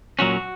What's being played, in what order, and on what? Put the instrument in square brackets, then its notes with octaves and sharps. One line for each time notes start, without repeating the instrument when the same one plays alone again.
[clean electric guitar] A#2 F#3 C#4 F#4